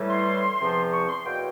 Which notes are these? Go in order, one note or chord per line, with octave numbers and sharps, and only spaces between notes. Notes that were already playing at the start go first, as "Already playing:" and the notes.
Already playing: A2 E3 G3
C6
E2 C3 F3
C#6
C6
E2 B2 F#3 A#3 G5